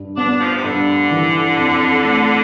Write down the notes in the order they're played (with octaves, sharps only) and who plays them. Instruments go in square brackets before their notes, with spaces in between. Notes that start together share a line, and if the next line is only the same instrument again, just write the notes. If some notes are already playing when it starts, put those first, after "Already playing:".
Already playing: [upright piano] G2
[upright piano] B3 [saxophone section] D4
[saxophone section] F3
C3
[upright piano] G2 [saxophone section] D3
[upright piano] E3
F2
A3